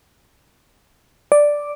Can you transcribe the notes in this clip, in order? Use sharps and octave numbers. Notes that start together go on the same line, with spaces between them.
D5